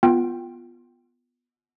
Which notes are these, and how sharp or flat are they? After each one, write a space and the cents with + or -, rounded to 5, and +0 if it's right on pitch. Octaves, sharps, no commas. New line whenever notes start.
B3 +0 F4 +0 G5 +0